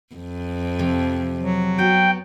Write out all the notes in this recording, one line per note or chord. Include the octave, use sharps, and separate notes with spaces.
F2
C3 F3
F#3
B3 F#4 G5